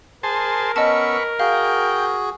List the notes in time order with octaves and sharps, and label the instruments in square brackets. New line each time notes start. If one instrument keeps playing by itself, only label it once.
[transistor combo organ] G#4 C5 A5 [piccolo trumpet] A#4
[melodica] B3 C#4 E6 [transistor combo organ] B4 C#6 [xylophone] D#5 A5
[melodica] F#4 G#4 [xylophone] F5 [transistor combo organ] G5